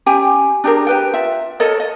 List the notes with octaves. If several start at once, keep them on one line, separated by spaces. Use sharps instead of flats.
C#4 G4 G5 G#5
D4 G4 G#4 A#4
G4 B4 G5
F4 E5
A4 A#4 C#5 D#5
D#5